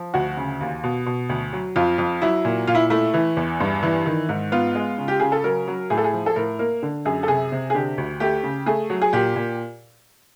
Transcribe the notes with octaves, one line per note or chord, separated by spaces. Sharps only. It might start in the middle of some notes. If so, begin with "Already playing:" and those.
Already playing: F3
D2 F#4
C#3
D#2
B2
B2
D2
F#3
F2 F4
F2
F#3 E4
A#2
A#2 F4
E4
A3 E4
E3
E2
G2
E3
D#3
G#2
B3 F4
G#3
C#3
G4
C#3 G#4
A4
F#3 A#4
F#3
A2 G#4
A4
G#4
F3
A4
A2 A#4
A#3 A#4
D3
F#2 G#4
A4
C3 G#4
C3
G#4
D3 G4
D2
A3 G4
C#3
A3 G#4
F#3
G#4
A#2 G4
A#2